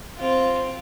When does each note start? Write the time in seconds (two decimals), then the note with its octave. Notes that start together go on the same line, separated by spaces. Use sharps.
0.17 C4 F4